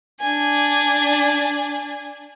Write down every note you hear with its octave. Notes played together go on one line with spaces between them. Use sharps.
D4 G#5